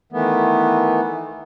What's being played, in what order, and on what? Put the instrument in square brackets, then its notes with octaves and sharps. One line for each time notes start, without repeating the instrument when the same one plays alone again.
[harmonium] D#3 E3 A3 B3